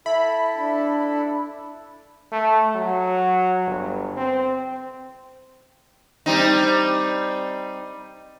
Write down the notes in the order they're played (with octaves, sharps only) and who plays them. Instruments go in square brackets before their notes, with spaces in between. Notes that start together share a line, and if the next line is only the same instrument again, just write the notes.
[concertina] E4 A4 [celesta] E5 [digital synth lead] B5
[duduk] D4
[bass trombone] A3
F#3
G1
C4
[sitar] G3 C4 D#4